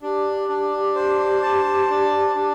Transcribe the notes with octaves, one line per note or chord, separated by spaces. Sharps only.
D4 G4
D4
C5
A5
D4
D4